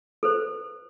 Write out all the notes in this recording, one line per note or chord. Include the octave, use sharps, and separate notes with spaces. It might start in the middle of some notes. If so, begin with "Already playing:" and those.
A4 B4 C5